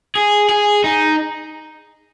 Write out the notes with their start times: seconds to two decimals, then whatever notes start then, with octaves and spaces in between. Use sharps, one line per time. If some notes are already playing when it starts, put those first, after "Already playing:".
0.15 G#4
0.49 G#4
0.84 D#4